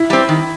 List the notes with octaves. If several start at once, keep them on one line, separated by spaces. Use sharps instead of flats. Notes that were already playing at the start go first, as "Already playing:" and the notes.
Already playing: E4
G3 C4
D#3